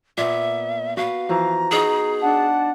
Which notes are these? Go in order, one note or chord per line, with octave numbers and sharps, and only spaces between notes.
A#2 B3 E5
F#4 B4 F5
E3 F3 F#4 A#5
B3 D#4 F#4 G#4
D4 F#5 A5